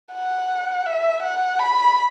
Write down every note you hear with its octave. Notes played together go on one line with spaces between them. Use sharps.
F#5
E5
F#5
B5